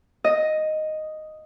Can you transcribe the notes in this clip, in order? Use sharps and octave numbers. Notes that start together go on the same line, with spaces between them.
D#5